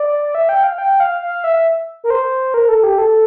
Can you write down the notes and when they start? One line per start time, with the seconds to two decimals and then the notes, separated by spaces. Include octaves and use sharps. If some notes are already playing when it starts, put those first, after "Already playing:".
Already playing: D5
0.35 E5
0.49 G5
0.64 F5
0.78 G5
1.00 F5
1.22 F5
1.44 E5
2.04 A#4
2.10 C5
2.54 A#4
2.69 A4
2.83 G4
2.98 A4